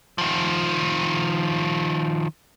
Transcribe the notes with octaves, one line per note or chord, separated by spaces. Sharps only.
D#3 F3